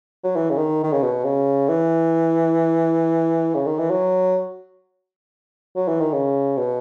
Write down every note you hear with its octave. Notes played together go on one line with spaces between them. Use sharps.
F#3
E3
C#3
D#3
D#3
C#3
B2
C#3
E3
C#3
D#3
E3
F#3
F#3
E3
D#3
C#3
B2